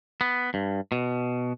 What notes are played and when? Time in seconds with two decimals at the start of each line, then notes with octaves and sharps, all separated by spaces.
0.21 B3
0.54 G2
0.92 B2